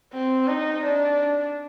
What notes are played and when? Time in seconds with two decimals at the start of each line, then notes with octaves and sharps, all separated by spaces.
0.13 C4
0.47 D#4
0.84 D4